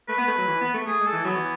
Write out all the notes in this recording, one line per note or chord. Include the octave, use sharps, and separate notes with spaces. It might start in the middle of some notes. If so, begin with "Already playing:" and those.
A3 B4
B3
A3
F#3
E3
B3
A3
A3 G#4
G#3
A4
E3
F#3 B3
E3